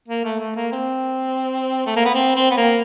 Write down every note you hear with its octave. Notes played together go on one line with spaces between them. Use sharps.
A#3
A3
A3
A#3
C4
A3
A#3
B3
C4
C4
B3
A#3